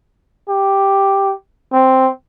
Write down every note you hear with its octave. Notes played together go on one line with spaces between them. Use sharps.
G4
C4